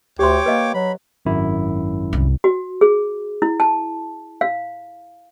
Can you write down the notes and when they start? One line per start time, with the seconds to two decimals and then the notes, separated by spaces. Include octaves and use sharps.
0.19 D2 G4 C#5 G5 C6 D6
0.46 A#3 B4 D#5
0.74 F#3 B5
1.25 G#1 F#2 E4
2.13 C2
2.44 F#4
2.81 G#4
3.42 E4
3.60 A5
4.41 F5